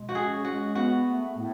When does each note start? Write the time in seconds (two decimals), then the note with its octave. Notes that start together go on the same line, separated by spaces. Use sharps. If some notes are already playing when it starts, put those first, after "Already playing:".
Already playing: B2 G#3
0.09 F#4
0.15 C#4 G#4
0.45 G#3 F#4
0.75 B3 F#4
1.05 A3
1.36 A2